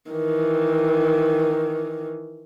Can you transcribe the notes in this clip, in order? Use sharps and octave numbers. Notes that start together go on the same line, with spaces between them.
D#3 E3